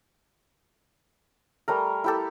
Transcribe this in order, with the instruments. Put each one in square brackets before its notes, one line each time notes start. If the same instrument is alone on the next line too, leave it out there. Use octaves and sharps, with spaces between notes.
[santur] G3 A3 A#4
E4 G4 A4